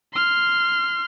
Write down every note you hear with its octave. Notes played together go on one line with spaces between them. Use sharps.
C6 F6